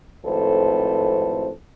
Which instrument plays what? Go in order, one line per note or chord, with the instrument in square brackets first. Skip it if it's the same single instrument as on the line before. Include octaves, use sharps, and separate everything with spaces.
[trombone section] G#1 F2 A2 A4 B4 C5